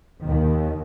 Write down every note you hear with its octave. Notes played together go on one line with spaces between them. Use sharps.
D#2 D#3